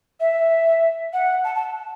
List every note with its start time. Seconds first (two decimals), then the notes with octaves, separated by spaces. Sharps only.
0.20 E5
1.13 F#5
1.44 A5
1.55 A5